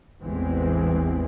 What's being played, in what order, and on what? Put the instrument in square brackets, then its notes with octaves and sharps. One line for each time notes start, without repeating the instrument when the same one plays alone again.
[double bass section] A1 E2 E3 G#3 C4